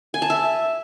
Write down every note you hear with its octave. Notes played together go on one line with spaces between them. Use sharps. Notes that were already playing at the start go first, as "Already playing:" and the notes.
G#5
A5
E5